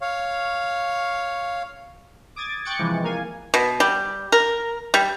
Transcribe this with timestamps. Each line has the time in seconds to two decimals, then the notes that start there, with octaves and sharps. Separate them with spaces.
0.01 C#5 F5
2.36 D6 D#6 G#6 A6
2.65 G5 C#6 D6 F#6 A6 C#7
2.79 C3 E3 F3 G#3
3.04 A#3 A#4 F5 G#5
3.54 B2
3.80 G3
4.32 A#4
4.94 G3